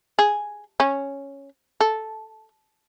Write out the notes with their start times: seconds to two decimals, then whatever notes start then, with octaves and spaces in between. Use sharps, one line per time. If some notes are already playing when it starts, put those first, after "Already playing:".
0.19 G#4
0.80 C#4
1.80 A4